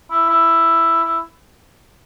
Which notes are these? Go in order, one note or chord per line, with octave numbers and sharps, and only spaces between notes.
E4
E4
E4